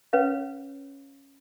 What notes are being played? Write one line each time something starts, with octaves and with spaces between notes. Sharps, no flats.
C#4 B4 C#5 F5